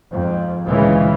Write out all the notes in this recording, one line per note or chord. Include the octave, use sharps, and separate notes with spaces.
F2 G#2
D2 A#2 C#3 E3 G#3